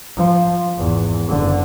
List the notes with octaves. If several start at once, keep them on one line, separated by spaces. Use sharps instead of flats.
F3
G#1 E2
F#1 D3